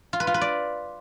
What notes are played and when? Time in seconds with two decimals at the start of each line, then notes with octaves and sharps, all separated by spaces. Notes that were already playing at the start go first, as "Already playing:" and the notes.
0.13 F4
0.20 B4
0.27 F4
0.34 B4
0.41 D5